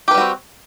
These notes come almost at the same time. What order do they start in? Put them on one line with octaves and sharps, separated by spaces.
G4 B4 G3 F#4 C4